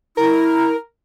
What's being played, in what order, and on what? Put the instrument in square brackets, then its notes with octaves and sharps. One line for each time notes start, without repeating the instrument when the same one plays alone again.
[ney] E4 [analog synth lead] A#4